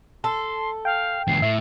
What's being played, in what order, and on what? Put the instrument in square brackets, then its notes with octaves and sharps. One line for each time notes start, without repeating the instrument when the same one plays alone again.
[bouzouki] A4 [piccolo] C6
[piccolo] F5 [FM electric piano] G5
[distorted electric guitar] C#2 E3 [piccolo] C7
[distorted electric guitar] A2 [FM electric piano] E5